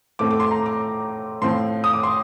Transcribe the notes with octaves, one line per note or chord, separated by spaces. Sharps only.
A2 A3 C4 D6
D6
C6
A#5
D6
A2 F3 C4 C6
D#6
D6
C6